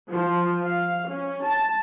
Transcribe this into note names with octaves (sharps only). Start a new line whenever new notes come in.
F3
F5
C#4
A5